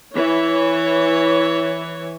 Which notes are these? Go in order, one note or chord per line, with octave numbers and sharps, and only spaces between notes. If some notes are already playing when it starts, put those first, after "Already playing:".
E3 C#5